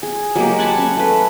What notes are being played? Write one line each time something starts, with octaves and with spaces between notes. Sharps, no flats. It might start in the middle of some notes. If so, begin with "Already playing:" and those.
G#4
F#3 G#3 A#3 G4
F#5 G#5 A5 B5
C#4
A3 B4